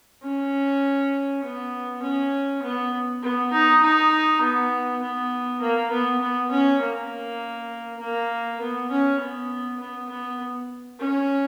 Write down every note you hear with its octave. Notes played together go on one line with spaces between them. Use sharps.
C#4
B3
C#4
B3
B3
D#4
D#4
B3
B3
A#3
B3
B3
C#4
A#3
A#3
B3
C#4
B3
B3
B3
C#4